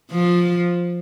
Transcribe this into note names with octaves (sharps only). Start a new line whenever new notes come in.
F3